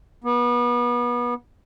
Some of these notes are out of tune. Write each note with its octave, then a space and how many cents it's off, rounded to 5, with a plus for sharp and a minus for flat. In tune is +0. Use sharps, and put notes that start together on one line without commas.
B3 -30